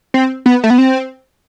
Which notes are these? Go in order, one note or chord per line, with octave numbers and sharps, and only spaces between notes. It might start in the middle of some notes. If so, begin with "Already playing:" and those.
C4
B3
A3
B3
C4